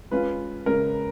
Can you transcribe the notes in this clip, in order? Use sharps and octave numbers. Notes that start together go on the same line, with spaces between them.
G#3 C#4 F4 B4
C#3 G#3 C#4 A#4